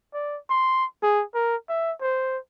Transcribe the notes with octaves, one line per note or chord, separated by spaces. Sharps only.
D5
C6
G#4
A#4
E5
C5